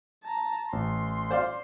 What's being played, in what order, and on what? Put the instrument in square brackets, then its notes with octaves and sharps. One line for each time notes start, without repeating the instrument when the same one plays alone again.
[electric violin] A5 A#5
[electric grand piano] A1 [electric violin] C6
[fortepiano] C5 D5 F5